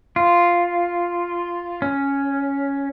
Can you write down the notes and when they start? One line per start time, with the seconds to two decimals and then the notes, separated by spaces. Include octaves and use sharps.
0.16 F4
1.82 C#4